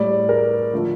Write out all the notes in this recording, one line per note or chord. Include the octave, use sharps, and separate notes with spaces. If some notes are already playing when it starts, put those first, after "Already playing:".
Already playing: A2 G3 D5
A#4
D3 F3 A3